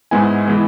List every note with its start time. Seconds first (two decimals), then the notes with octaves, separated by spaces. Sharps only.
0.11 G#2 G#3 B3 E4 G#5
0.48 E3 G#3 B3